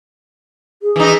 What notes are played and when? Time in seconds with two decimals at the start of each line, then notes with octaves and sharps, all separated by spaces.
0.83 G#4
0.96 E3 D#4